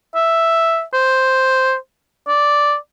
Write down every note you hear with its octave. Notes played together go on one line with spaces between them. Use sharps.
E5
C5
D5